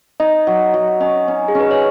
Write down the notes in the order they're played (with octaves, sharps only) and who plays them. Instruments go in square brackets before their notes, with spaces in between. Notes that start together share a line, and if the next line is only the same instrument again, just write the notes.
[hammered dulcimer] D#4 [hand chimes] D#5
[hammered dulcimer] F#3
F#3
[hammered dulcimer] C#4 [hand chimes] D#5
[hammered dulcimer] C#4
[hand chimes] G#4
[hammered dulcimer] C#4 [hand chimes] B4
[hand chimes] C#5